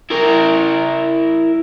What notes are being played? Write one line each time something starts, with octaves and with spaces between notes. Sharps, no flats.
E4 A#4